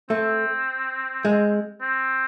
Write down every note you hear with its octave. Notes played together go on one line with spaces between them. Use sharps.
A3 C4
G#3
C4